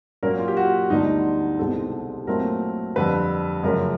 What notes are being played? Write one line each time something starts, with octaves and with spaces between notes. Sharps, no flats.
A#2 F#3 A#3 C#4 A#4
F4
G4
F#4
D2 D3 G3 B3 D#4
C2 B2 G#3 C4 A4
A#2 F#3 A3 C4 A#4
F2 D3 G3 B4
F#2 C#3 F3 A3 C#4 A#4